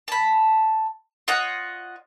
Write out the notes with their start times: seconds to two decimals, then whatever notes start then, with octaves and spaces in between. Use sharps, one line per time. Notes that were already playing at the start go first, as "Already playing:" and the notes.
0.08 A5 B5
1.28 F4 C#5 D#5 F#5